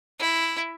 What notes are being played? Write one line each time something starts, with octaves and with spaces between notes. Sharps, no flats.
E4